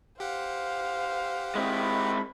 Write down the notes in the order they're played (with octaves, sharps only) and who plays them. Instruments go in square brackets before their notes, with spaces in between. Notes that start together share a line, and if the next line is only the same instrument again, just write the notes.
[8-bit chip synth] G4 F#5 [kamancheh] C5 F5
[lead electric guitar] G#3 C4 [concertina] E4 B5